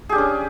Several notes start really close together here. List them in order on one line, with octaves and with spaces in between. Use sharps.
G#4 G4 D4 C#4